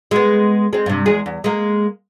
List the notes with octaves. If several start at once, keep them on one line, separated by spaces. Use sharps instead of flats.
G#3 B3
G#3 C4
G2 C3
E2 G#3 G#4
E2
G#3 A#3